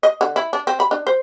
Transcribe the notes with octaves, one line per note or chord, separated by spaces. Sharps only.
D#5
D3
E4
D4
C4
B5
D4
C5